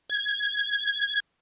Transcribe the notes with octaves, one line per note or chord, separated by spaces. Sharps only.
G#6